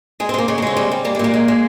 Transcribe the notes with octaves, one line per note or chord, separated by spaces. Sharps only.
G#3 G#4
C4
G#3
A#3
C#3 G#3
A#3
G#3 C4
G3
G3
G3 A#3
G#3
A#2 A#3
G#3
G#3